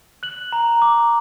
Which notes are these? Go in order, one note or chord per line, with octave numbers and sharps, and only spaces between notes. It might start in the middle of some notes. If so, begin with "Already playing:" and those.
F#6 F#7
A#5
D6